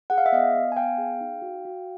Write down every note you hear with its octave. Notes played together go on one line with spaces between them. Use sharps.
G#4 F#5
F5
E5
B3 D#5 F5
B3
G#5
B3 F5 G5
G#4
D#4
F#4
F#4